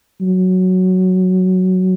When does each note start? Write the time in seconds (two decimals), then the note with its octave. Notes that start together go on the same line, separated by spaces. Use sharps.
0.22 F#3